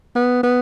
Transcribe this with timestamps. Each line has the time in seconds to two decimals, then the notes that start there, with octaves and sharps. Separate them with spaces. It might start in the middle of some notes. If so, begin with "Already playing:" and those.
0.15 B3
0.43 B3